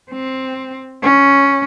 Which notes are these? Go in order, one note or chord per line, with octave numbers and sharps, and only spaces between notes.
C4
C#4